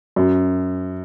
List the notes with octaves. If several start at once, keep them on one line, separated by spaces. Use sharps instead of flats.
F#2